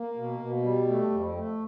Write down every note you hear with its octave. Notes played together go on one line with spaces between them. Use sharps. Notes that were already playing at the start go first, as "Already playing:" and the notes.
Already playing: A#3
B2
B2
G3
A3
F2
A3